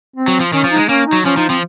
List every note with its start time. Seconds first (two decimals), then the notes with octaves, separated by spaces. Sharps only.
0.16 C4
0.28 F#3
0.40 F3
0.53 D#3 C#4
0.64 F3
0.71 D#4
0.76 G#3
0.89 A#3 C#4
1.07 D#4
1.13 F#3
1.25 F3 C#4
1.37 F3 D#4
1.49 F3 C4